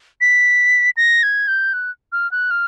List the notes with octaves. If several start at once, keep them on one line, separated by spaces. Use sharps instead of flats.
B6
A#6
G#6
G6
F#6
F6
F#6
F6